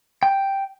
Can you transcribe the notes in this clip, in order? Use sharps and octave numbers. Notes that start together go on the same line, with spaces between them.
G5